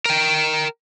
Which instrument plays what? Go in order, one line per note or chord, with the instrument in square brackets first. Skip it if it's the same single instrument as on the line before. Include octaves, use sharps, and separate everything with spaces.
[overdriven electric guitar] A#4 G5